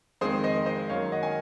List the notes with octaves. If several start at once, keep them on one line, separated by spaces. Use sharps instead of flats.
F2 D#3 G#3 C4 G#4 C5
C5 D#5
C5 D#5
F#2 D#3 F#3 A#3 C#5 F5
D#5 F#5
G#5